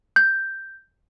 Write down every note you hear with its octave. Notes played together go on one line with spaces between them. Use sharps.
G6